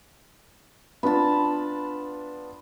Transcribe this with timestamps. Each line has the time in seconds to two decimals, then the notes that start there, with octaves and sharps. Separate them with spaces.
1.03 B3 D4 F4 A5 B5